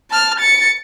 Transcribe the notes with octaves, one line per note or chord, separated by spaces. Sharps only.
A5 F6
A6 C#7